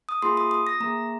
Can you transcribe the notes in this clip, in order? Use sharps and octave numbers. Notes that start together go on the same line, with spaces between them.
D#6
A#3 F4 G#4 C6
D#6
D#6
A#6
A#3 G#4 A#5